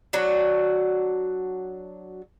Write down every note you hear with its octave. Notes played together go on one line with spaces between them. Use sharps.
F#3 D4 F#4